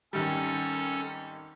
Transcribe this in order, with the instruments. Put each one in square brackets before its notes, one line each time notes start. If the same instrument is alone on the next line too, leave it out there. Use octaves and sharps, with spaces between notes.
[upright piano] G#1 D#3 G3 [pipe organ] C#4 A4